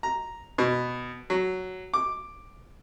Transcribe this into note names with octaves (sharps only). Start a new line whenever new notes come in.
A#5
B2
F#3
D6